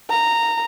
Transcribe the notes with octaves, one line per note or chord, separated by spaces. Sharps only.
A#5